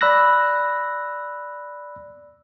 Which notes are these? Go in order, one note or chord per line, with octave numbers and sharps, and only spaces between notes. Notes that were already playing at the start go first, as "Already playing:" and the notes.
D5 B5 E6 F#6 A#6